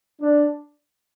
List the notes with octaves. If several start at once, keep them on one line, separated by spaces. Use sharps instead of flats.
D4